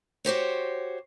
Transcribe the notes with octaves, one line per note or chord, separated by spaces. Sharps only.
F#4 G4 C5 C#5